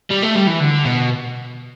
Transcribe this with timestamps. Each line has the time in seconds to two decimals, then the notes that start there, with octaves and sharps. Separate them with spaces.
0.10 G3
0.22 A3
0.35 G3
0.47 E3
0.60 D3
0.85 B2